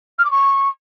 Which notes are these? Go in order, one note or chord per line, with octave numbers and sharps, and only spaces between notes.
F6
D6
C#6